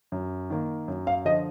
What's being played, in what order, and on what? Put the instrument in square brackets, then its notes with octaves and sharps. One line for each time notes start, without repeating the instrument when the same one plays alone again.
[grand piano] F#2
D#3 A#3
F#2
F5
D3 F3 D#5